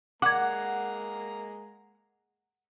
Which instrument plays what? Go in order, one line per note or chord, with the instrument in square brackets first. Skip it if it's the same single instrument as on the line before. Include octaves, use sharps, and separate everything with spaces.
[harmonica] G#3 A#3 A#5 [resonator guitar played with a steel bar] F#5 [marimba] D6 G#6